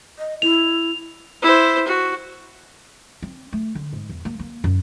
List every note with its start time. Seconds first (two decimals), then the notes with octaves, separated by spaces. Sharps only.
0.19 D#5
0.42 E4 F7
1.42 E4 C5
1.87 F#4
3.22 C4
3.53 A3
3.75 D3
3.93 G#2
4.09 E2
4.25 A#3
4.39 A#3
4.64 F#2